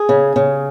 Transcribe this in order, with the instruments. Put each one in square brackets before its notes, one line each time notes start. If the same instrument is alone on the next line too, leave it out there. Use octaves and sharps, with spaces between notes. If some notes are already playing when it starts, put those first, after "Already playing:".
Already playing: [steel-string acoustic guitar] G#4
C#3
C#3